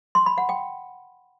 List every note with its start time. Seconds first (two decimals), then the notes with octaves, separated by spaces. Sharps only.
0.15 C6
0.26 B5
0.38 F#5
0.49 G5